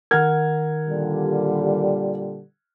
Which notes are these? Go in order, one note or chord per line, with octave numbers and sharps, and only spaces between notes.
D#3 A#4 F#5 F6 G#6
A#2 D3 G3